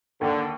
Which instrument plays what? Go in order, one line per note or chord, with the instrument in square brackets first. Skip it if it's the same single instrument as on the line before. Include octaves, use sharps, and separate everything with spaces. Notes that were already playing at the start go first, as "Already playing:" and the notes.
[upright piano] D#2 [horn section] D3